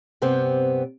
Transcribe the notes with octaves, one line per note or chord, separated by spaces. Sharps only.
G2 C3 B3 C4